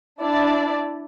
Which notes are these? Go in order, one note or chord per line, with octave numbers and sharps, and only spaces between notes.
D4 E4 D5 E5